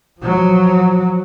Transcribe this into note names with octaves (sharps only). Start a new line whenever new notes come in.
F3 F#3